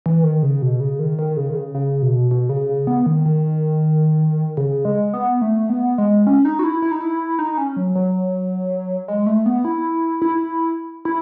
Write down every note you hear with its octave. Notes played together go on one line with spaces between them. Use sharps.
E3
D#3
C#3
B2
C#3
D#3
D#3
C#3
D#3
C#3
C#3
B2
B2
C#3
C#3
B3
D#3
D#3
C#3
G#3
B3
A3
B3
G#3
C#4
D#4
F#4
E4
E4
D#4
E4
D#4
C#4
F#3
F#3
G#3
A3
B3
E4
E4
E4